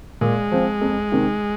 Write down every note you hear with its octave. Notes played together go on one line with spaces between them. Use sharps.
A#2 G#3
F3 C4
F2
C3 D#3